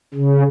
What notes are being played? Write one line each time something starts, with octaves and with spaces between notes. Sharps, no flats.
C#3